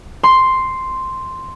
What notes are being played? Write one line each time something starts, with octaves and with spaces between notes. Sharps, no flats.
C6